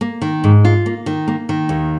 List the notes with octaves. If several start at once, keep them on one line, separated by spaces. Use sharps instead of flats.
A#3
D#3
G#2
F4
A#3
D#3
A#3
D#3
D#2